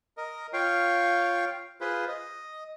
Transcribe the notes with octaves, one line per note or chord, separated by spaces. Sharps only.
A#4 D#5
F4 C#5 F5 G5
F4 G#4 B4 C5
D#5